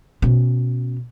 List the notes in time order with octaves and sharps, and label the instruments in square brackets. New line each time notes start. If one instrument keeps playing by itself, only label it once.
[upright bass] B2 C#4